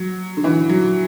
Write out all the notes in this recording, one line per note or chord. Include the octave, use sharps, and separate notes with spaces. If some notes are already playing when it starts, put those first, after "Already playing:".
Already playing: F#3
D3
E3
F#3